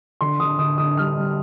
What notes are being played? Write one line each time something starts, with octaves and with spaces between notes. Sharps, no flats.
D3 C6
D3 D#6
D3 D#6
D3 D#6
G3 F6
G3